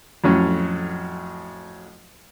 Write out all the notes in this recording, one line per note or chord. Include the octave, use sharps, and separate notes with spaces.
F2 A2 F#3 C#4